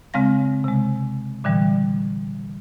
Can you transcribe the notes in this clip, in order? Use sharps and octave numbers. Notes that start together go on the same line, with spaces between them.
C#3 G#3 C4 F5 A#6
C3 G#3
A#2 D3 E3 G3